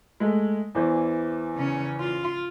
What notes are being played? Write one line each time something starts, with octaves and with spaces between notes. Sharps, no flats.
G#3 A3
E2 E3 C5
C#3 C#4
F4